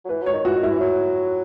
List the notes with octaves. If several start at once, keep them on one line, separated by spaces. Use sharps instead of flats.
F#3
E3 B4
F#3 C#5
D#3
E3 F#4
D#3
E4
E3
F#3